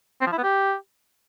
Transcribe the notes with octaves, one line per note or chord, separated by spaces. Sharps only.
C4
F3
E4
B3
G4